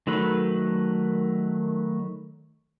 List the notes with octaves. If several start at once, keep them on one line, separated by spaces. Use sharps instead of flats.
D#3 F#3 A3 B4